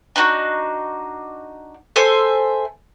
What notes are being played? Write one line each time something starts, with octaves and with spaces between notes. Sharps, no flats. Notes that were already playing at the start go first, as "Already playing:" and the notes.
D4 D#4 F4 F#4
A4 C5 E5 G#5